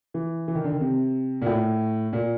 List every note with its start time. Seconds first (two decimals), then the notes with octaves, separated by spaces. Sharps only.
0.14 E3
0.48 E3
0.55 D#3
0.64 D3
0.72 D#3
0.81 C3
1.42 A#2
1.46 A2
2.13 A#2